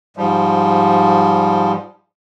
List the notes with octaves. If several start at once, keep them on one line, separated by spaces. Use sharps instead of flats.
G#2 F3 G3